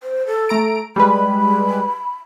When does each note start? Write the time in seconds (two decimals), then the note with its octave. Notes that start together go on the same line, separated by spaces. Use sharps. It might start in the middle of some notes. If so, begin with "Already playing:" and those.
0.03 C5
0.27 A4
0.49 A3 A#5 D7
0.96 G3 G#3 B4 B5